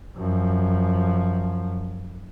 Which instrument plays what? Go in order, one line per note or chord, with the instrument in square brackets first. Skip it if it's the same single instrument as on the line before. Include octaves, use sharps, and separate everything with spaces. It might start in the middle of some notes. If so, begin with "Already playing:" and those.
[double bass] F#2 F3